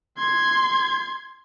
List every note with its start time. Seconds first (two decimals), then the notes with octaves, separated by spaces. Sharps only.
0.17 C6 G#6